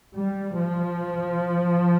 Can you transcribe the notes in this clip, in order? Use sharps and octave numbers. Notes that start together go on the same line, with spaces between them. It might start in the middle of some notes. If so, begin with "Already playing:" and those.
G3
F3